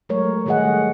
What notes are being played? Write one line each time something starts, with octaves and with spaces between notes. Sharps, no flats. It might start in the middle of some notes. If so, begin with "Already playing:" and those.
F#3 G#3 A3 A#4 C#5
D#3 G3 A3 G#4 D#5 F#5